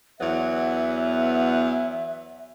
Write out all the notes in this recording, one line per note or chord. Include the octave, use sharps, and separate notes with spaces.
E2 F#3 B3 E5